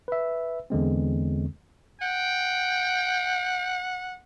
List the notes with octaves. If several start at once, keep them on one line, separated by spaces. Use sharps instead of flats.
B4 E5
E2 D3 G#3 C4
F#5 G5